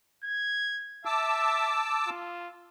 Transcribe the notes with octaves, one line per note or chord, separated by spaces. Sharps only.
G#6
E5 A5 D6 E6
F4